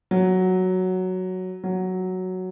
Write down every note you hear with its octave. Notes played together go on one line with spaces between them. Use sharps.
F#3
F#3